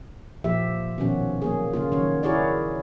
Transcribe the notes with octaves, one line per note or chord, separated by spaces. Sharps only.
A#2 F3 G4 E5
B2 D#3 F3 C#4 F#4
F#3 A#3 G#4
C#3 A#3 F4
D#3 F#3 C#4 C#5
E4 F#4 G#4 A#4 C#5 D5